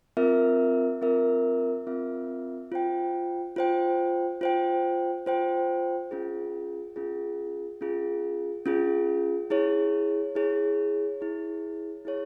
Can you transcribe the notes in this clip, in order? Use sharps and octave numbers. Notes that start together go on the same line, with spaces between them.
C4 F4 A#4 E5
C4 F4 A#4 E5
C4 F4 A#4 E5
F4 C5 G5
F4 C5 G5
F4 C5 G5
F4 C5 G5
C#4 F4 G#4
C#4 F4 G#4
C#4 F4 G#4
C#4 F4 G#4
E4 G#4 C#5
E4 G#4 C#5
E4 G#4 C#5
E4 G#4 C#5